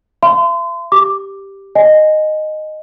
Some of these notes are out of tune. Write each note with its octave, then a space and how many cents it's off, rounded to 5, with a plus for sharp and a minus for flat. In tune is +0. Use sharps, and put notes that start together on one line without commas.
E5 +45 C6 -35
G4 +0 D6 +0
D#5 -10 G#5 +0